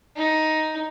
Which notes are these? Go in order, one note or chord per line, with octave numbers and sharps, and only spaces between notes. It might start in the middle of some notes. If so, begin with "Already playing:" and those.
D#4